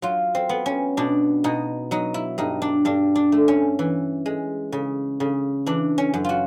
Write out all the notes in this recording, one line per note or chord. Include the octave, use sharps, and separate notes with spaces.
F#3 F4
C4
B3
C#4
B2 D4
B2 D#4
F#3 D#4
E4
G2 D#4
D4
G2 D4
D4
A3
C#4
E3
G#3
C#3
C#3
E3 D4
C#4
F#2
F4 F#4